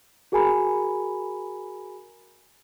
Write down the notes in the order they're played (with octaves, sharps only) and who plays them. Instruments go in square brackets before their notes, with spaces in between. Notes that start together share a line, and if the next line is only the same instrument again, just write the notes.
[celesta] F#4 G#4 A#4 G#5 A#5 B5